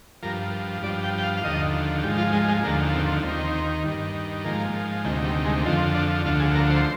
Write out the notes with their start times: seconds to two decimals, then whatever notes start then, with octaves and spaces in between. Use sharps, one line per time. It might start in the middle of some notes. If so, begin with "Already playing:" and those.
0.22 G2 F3 A#4
0.82 G2 D5
0.86 F3
1.03 G5
1.18 G5
1.23 F5
1.37 F5
1.44 D#2 D3 F3 D#5
2.03 G#2 F3 G4
2.18 F4
2.33 G#3
2.48 G#3
2.63 D#2 D3 F3 A#3
2.93 C4
3.24 D#2 D#3 C4
3.85 G2 D#3
4.45 G#2 F3 A#3
5.05 D2 C3 D#3 G#3
5.25 G3
5.45 G#3
5.65 F2 D3 F3 C4
5.95 D4
6.25 D2 D3 F3 F4
6.40 G#4
6.55 A#4
6.70 C5